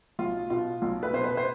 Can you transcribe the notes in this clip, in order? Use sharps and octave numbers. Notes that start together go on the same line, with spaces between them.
B1 F4
B2 F4
B1 F4
B4
B2 C5
B4
C5